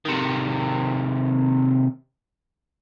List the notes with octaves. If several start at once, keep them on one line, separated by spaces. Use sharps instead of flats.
C3 D#3